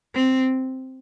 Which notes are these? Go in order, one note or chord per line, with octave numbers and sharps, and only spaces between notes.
C4